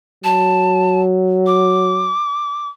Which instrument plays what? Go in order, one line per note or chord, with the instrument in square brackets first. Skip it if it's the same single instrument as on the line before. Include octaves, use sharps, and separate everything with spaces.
[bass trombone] F#3 [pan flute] A5
[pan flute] D6